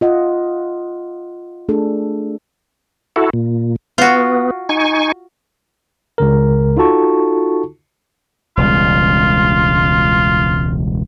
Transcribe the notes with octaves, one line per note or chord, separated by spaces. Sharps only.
F4 D#5 F#5
A3 D4 G#4 A4
E4 F#4 A4
A#2
B3 F4 F#4
D#4 G#5 C#6
C#2 C#3 A#4
D#4 F4 F#4 A4 A5 C#6
E1 C#2 G3 F4